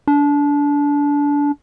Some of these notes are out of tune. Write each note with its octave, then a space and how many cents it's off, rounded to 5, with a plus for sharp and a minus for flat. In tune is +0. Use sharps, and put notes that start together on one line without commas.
D4 -25